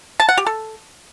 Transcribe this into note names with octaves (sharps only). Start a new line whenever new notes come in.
A5
F#5
G4
A4